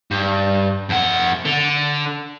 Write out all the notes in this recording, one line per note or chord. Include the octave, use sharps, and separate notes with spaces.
G2
F2 F#5
D3